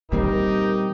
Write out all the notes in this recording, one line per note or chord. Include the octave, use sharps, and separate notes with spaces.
A#2 E3 G3 C4 D#4 G4 A#4